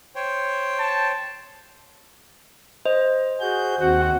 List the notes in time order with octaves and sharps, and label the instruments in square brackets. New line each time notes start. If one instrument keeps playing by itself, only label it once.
[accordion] C5 C#5 G5
[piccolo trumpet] A5
[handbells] C5 D#5
[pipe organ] F#4 G#4 G6
[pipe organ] D#2 C4 F#5 [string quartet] F#4